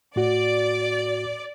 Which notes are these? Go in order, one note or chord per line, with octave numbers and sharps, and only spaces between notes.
A2 F#4 D5